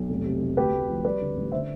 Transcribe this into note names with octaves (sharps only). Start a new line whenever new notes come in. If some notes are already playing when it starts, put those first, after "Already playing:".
Already playing: B1
F1
C3
F1
D2 G4 B4
D2
F3
G3 B4 D5
D3
A1
D3 C5 E5